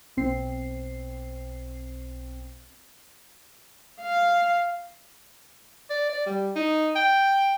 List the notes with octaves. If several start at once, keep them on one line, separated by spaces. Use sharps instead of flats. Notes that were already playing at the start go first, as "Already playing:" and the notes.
B1 C4 C7
F5
D5
D5
G3
D#4
G5